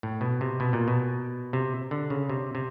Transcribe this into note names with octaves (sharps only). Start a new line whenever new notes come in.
A2
B2
C3
B2
A#2
B2
C3
D3
C#3
C3
C3